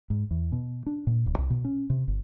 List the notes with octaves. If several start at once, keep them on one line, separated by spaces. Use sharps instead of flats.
G#2
E2
B2
D4
A#2
D1
C2
B2
C#4
C3
G1